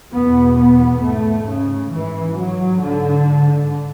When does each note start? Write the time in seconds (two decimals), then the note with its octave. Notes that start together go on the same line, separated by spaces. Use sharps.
0.12 E2 B2 B3
0.58 B3
1.01 G#2 A3
1.47 C#3
1.92 G#2 E3
2.37 F#3
2.81 G#2 D3